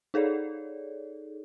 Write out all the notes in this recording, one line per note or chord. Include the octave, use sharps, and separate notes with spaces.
D#4 G#4 A4 C#5 D5